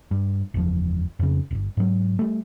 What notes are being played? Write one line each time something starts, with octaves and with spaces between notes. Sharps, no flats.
G2
F#1 E2 F3
F2 C#3
D1 G1
G#2 F#3
G3 A3